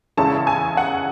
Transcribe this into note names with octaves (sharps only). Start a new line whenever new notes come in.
E2 C#3 G#3 C#4 E4 A5
G#5
F#5